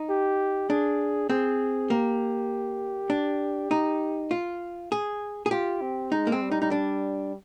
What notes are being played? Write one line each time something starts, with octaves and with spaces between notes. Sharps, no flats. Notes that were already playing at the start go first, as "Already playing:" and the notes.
Already playing: D#4
G4
D4 G#4
C4 G#4
A#3 G4
D4
D#4
F4
G#4
G#4
F4 G4
C4
G#3 D#4
A#3
C4
G3
D#4
D#4
D4